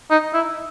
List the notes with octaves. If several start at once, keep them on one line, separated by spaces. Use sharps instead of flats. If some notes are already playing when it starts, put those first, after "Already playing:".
D#4
E4